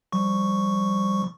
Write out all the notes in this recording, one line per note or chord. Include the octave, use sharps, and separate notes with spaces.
F3 G3 C#6